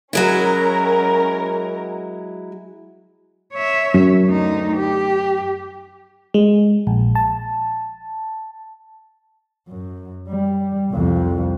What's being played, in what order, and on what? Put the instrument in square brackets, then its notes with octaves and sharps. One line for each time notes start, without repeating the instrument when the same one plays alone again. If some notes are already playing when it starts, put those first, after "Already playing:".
[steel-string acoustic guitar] F#3 G#3 E4 [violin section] C#4 A#4
[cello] C#5 E5
[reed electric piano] F#2
[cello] D2 D#4
G4
[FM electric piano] G#3
A#1
A5
[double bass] F#2
G3
C2 F2